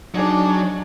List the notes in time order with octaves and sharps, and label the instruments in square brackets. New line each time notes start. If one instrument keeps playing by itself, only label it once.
[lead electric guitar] F#3 [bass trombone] D4 [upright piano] D#4 G#4 D5